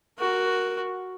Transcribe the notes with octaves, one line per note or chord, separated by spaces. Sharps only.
F#4 A#4